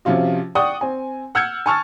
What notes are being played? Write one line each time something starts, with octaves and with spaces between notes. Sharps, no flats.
C3 F3 C#4 F4 F#4
D5 F#5 G5 C#6 D#6
C4 G#5
F#5 E6 F6 G6 G#6 C#7
G#5 A5 C#6 E6 F6 A6